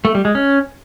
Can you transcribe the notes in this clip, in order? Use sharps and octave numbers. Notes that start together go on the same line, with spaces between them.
A3
G3
G#3
C#4